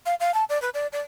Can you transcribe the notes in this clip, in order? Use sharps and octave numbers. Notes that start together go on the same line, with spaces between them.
F5
F5
A5
D5
B4
D5
D5